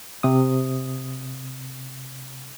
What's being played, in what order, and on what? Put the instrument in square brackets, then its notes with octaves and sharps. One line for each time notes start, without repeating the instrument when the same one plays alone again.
[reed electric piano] C3 D#6